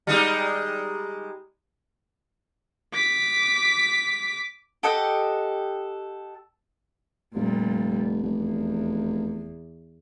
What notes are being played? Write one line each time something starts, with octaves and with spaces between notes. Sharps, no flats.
G3 G#3 D#4
D6 B6
G4 A4 D#5 F#5
F1 A#2 G3
F1 E2